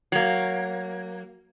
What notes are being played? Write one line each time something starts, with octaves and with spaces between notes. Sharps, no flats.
F#3 A#3